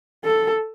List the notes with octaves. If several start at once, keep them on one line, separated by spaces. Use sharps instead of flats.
A4